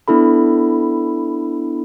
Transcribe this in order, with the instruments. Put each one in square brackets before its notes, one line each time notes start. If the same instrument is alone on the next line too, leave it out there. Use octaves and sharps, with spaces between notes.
[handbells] B3 D4 E4 A4 B5